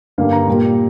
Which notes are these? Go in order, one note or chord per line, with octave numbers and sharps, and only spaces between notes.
G2 D3 G3 A#3 F5
A#5
A#2 G3 A#3